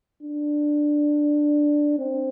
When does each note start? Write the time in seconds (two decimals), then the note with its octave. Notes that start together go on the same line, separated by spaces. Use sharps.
0.23 D4
1.99 C4